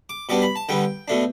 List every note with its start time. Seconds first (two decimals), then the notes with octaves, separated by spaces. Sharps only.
0.09 D6
0.29 B2 G3 B3 D4 D6
0.42 B5
0.56 A5
0.69 D3 G3 B3 G5
1.08 B2 A3 D4